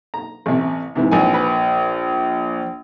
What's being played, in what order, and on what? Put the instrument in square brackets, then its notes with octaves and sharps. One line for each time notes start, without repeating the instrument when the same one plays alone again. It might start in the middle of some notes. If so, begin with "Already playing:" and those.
[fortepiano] A#5
A1 C3
G#2 C3 E3
[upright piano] A#1 G#5
[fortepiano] B4